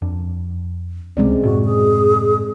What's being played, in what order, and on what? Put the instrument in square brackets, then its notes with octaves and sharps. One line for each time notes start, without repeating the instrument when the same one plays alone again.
[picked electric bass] F2 D4
[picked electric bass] C#2 C3 [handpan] G#3 C4 D5 [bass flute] C#4
[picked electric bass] F#2 A2 C3 [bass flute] F#4
[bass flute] G#4